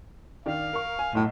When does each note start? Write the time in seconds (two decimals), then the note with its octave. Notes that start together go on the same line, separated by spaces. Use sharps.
0.46 D#3 D4 F5
0.73 A#4 C#6
0.99 G#5
1.15 B1 A2